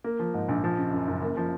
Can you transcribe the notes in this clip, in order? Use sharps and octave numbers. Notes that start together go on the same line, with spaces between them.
A#3
F3
G#2
A#1
F3
C#3
F#2
F#1
A#3
F3